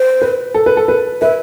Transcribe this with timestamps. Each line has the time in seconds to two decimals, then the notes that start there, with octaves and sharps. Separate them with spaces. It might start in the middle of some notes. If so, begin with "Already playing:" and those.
Already playing: C5
0.22 B4
0.54 A4
0.66 B4
0.77 A4
0.88 B4
1.22 B4 E5